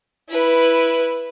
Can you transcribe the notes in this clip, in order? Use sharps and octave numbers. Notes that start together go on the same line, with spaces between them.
E4 B4